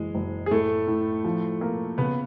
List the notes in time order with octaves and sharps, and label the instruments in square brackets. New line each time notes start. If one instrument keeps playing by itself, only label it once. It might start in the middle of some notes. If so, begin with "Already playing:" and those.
Already playing: [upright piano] F#1 E3 [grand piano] G#3
[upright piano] F#1
[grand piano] G#4
[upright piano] A2 [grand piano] A3 A4
[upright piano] A2
F3
A#3
[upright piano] C#3 [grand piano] B3 B4